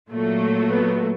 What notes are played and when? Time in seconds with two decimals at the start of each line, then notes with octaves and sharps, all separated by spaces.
0.11 A#2 F#3 A3
0.69 B3